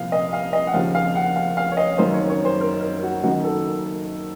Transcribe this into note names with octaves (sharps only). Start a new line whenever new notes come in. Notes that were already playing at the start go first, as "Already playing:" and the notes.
Already playing: C2 A#2 F3 F5
D#5
F5
D#5
F#5
D#2 C#3 F3 F5
F5
F#5
F5
F5
C#5
D#5
F#1 F#2 D#3 C5
C#5
C#5
C5
A#4
A#4
F#4
F#1 F#2 D#3 F#4
A4